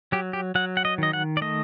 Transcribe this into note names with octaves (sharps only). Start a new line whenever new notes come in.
F#3 G4
G4
F#3 F#5
F#5
D#5
D#3 D#5
F#5
D5
A3 D#5